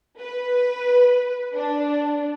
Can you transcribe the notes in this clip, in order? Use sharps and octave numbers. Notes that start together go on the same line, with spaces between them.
B4
D4